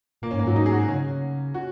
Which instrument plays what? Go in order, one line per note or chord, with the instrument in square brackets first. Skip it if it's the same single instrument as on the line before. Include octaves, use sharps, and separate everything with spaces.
[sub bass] A#2 [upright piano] A#3
[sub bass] G#2 [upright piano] C#4
[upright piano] A#3
[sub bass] G#2 [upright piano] F#3
[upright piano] D#4
G#4
F#4
[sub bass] C#3 [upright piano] C#4
[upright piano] F#4